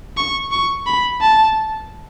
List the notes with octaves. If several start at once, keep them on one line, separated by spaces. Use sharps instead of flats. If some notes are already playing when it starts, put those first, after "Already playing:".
C#6
C#6
B5
A5